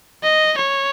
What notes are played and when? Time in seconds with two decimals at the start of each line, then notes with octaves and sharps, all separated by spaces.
0.23 D#5
0.58 C#5